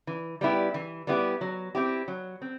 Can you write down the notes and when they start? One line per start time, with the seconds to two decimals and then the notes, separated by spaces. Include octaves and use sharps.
0.07 E3
0.41 G3 B3 E4 G4
0.74 E3
1.07 G3 B3 E4 G4
1.41 F#3
1.75 C4 E4 G4
2.08 F#3
2.42 C4